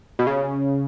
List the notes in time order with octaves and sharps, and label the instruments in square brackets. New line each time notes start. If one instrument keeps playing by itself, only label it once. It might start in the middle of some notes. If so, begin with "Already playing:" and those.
[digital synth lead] B2
C#3